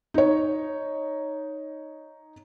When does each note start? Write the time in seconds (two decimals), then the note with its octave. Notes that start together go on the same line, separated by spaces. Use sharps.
0.14 D#4 C#5